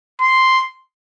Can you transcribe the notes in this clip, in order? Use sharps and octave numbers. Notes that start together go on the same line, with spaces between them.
C6